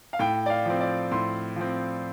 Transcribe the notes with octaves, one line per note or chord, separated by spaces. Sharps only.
F5
A2 G5
D5
F5
F3 C4
D5
A2 C6
F3 C4